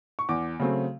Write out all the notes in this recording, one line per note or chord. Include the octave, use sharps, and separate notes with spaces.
C#6
E2 D6
C#3 F#3 A3 C4